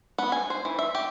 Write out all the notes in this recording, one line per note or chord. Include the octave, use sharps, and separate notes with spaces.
B3
G#5
C5
E3
E5
G4